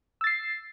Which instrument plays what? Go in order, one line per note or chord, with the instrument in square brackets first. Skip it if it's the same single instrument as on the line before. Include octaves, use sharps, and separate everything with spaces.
[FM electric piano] E6
A6
C7